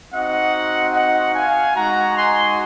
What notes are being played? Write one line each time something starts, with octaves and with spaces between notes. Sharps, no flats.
C4 D#4 F#4 D#5 F#5
D#5 F#5
F5 G#5
G#3 D#4 F#4 F#5 A#5
G#5 C6